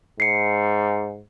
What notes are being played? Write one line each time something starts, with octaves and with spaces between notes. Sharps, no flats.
G#2 C7 C#7